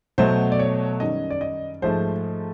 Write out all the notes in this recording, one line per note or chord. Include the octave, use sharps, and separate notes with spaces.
B2 F#3 A3 C5
D5
C#5
F#2 D#3 G3 D#5
D5
D#5
G#2 F3 A3 C5